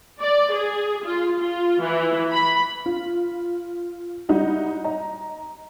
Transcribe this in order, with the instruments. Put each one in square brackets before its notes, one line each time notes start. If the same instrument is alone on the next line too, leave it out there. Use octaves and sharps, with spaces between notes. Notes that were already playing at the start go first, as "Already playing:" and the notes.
[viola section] D5
G#4
F4
F4
E3
B5
[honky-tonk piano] F4
G3 D#4 E4 F#4
D#5 A#5